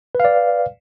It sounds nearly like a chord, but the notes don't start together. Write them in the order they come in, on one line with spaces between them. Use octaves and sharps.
B4 F5 D5